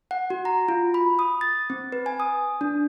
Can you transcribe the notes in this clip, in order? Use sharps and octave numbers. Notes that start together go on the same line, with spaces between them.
F#5
F#4
A#5
F4
B5
D#6
A6
C4
B4
G#5
D#6
D4